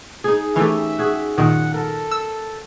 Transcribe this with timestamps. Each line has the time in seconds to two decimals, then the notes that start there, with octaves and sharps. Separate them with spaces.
0.24 D#4 G#4
0.56 E3 A3 C#4 G4 E5
0.98 F#4 G#4
1.38 F#2 A#2 D#3 F#5
1.74 A4 A#4
2.11 E6